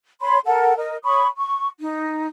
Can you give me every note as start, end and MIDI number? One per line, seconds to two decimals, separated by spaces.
0.21 0.38 73
0.21 0.38 83
0.21 0.38 84
0.45 0.74 69
0.45 0.74 70
0.45 0.74 78
0.76 0.96 70
0.76 0.96 75
1.04 1.26 73
1.04 1.26 83
1.04 1.26 85
1.04 1.26 87
1.36 1.68 85
1.79 2.27 63